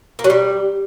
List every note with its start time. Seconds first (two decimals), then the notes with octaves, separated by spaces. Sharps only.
0.19 A#3
0.24 F#3
0.30 G3